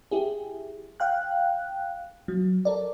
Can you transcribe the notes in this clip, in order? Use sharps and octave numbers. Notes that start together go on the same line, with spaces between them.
E4 G4 G#4
F5 G5 F#6
F#3
A4 A#4 D5